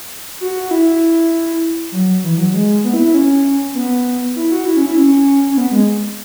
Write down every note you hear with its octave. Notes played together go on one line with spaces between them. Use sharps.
F#4
F#4
E4
F#3
E3
F#3
G#3
B3
E4
E4
C#4
B3
E4
F#4
E4
C#4
E4
C#4
C#4
B3
G#3